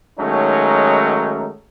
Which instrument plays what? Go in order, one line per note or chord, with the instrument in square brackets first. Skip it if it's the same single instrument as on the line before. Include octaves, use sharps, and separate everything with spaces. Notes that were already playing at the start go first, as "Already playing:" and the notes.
[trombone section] D#3 F#3 G#3 A3 C#4 D#4